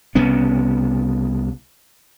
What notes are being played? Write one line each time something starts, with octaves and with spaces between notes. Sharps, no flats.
C2 C#3 B3 C#4